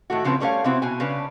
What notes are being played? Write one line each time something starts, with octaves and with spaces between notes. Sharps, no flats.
A2 D#3 A3 F#4
C#3 F3 C4 C#4 B4
G3 A3 C#4 B4 C#5 F5
C3 B3 C4 E4 F#4
B2 G#5
C#3 C#4 D4 B4